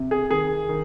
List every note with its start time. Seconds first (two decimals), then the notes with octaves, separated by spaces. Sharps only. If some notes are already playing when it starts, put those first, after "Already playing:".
Already playing: C3
0.11 G#4
0.30 D#3 G#4
0.69 D#3